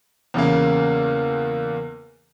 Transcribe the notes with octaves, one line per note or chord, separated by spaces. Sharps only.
E2 C#3 A#3